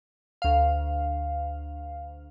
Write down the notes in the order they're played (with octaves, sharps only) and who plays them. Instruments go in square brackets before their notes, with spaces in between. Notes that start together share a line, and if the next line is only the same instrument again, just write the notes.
[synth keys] D2 F5